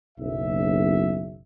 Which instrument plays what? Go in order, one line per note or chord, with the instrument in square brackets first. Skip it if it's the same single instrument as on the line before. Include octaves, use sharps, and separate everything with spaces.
[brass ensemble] F#1 B1 E5